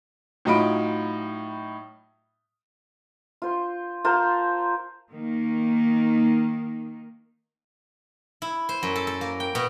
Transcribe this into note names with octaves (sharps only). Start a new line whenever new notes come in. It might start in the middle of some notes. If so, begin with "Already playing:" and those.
A2 F#3 D#4 F4 B5 D7
F4 C5
F4 A#4 C5 A5
D#3 A#3
E4
C5
F#2
A4
A4
A#3
G5
B2